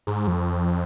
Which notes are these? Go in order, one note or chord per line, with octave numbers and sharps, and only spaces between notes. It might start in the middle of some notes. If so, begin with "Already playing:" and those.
G#2
F2